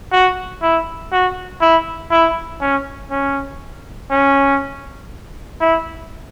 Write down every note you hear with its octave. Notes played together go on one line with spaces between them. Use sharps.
F#4
E4
F#4
E4
E4
C#4
C#4
C#4
E4